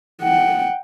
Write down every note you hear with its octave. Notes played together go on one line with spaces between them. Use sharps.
F#5 G5